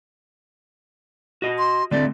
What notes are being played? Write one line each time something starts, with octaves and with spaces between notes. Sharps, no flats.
F#4 D#5
C6
D3 A3 C4 D5